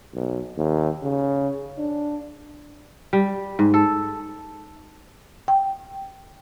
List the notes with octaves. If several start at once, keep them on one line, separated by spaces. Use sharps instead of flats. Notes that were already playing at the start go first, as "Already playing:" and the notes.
B1
D#2
C#3
D4
G3
G#2
A4
G5